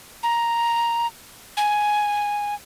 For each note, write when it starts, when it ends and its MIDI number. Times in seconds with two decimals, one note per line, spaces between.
0.23 1.07 82
1.57 2.54 80